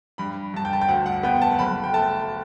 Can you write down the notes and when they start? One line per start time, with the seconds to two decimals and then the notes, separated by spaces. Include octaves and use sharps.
0.18 G2 B5
0.54 G2 A5
0.65 G5
0.73 A5
0.81 G5
0.88 D2 F#5
1.06 F#5
1.23 B3 G5
1.42 A5
1.59 F#1 B5
1.84 G5
1.93 A3 A5